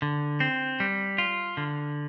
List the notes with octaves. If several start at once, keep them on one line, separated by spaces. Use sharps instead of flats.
D3
C4
G3
F4
D3